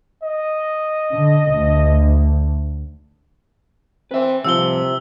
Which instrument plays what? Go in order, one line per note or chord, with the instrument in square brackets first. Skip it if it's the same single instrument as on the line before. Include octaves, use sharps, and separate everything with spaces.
[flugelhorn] D#5
[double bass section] D3
D2
[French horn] C4 [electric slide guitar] B4 E5
[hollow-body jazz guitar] C2 F3 [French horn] C3 [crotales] E6 G7